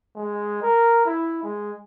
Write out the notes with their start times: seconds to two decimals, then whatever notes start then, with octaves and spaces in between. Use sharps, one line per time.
0.16 G#3
0.63 A#4
1.06 E4
1.44 G#3